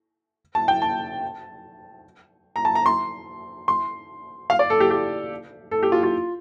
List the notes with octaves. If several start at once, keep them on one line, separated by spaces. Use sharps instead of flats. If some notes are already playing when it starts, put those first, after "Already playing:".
A5
G5
A5
A#5
A5
A#5
C6
C6
F5
D5
A4
G4
G4
A4
G4
F4
F4